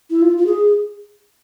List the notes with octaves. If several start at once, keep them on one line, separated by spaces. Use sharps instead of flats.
E4
F4
F4
G#4